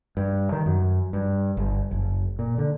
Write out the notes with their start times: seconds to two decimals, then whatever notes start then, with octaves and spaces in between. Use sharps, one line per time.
0.17 G2
0.52 D#3
0.66 F#2
1.13 G2
1.57 G1
1.91 F#1
2.39 A#2
2.58 D3